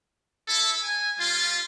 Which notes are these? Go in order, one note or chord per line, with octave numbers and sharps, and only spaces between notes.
E4 A4
G#5
G3 F4